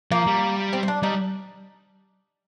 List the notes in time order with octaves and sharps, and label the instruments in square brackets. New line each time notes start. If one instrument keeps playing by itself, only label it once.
[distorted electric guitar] F3 [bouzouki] A#3
[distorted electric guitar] G3
[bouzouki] C4
C4
D4
[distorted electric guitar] G3 [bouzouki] D#4